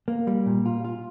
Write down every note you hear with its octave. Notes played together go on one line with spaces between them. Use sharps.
A#3
G3
A#2
F4
F4